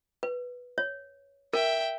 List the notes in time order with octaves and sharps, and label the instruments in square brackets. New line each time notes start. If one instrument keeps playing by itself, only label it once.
[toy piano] B4
C#5
[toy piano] A#4 [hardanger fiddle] E5 G5